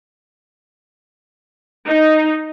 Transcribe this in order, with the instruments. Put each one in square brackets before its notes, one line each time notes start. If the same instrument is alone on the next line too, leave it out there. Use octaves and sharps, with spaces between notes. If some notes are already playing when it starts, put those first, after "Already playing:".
[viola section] D#4